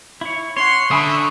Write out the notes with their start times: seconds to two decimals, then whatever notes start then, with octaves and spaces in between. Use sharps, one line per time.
0.21 E4 C#5
0.57 C#4 C#5 F#5 C6
0.91 D3 C#4 E5 G#5 B5 C#6 D#6